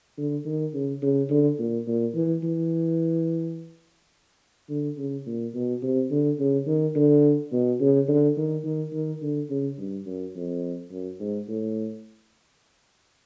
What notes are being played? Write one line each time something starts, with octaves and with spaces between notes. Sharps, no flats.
D3
D#3
C#3
C#3
D3
A#2
A#2
E3
E3
D3
C#3
A#2
B2
C3
D3
C#3
D#3
D3
B2
C#3
D3
D#3
D#3
D#3
D3
C#3
G2
F#2
F2
F#2
G#2
A2